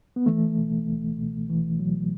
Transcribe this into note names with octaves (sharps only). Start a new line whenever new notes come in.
B3
C#2 E3 A3
B2
C#2
B2
C#2 E3
B2 F#3